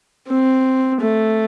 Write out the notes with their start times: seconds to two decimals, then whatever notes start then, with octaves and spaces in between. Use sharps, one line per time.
0.28 C4
1.01 A3